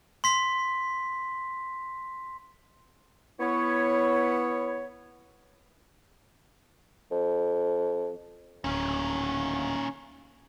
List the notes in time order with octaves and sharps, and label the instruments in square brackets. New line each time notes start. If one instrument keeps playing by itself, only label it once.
[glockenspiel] C6 B6
[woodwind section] B3 E4 C#5
[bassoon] F2
[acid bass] D1 [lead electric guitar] A#2 D#3 [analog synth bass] C#4